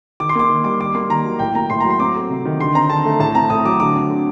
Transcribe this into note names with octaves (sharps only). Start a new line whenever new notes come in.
D#3 D6
C6
A#3 D6
D#3
G3 D6
D#3 D6
A#3 C6
D#3 A#5
F#3
A2 G5
A#3 A#5
A2 C6
F#3 A#5
C6
C4 D6
A3
C3
D#3
D3 C6
C4 A#5
D3 A5
A3
A2 A5
C4 A#5
A2 D#6
F#3 D6
D3 D6
C4
D3